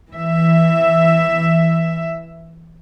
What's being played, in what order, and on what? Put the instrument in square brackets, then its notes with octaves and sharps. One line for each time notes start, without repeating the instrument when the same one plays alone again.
[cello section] E3 E5